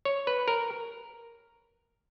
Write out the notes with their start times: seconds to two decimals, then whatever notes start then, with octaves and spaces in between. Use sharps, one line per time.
0.05 C#5
0.27 B4
0.48 A#4